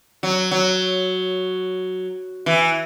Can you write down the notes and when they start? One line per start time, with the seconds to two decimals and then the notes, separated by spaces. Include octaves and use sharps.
0.23 F#3
0.51 F#3
2.46 E3